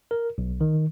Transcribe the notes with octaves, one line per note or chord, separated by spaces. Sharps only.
A#4
B1
D#3